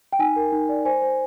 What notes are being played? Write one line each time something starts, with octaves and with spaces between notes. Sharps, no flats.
G5
D#4 G#5
A#4
D#4
D5
C5 G#5
C5